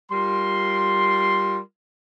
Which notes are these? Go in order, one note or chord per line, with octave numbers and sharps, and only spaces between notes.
G3 F4 A#4 C6